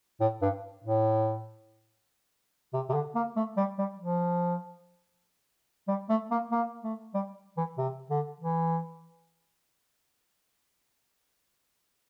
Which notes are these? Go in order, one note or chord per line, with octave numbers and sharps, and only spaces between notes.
A2
G2
A2
C3
C3
D3
A#3
A3
G3
G3
F3
G3
A3
A#3
A#3
A3
G3
E3
C3
D3
E3